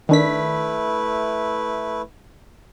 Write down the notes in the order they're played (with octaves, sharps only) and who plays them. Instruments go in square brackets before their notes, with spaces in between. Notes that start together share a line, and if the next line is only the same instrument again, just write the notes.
[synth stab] D#3 D4 B6 [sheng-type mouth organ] A3 E4 B4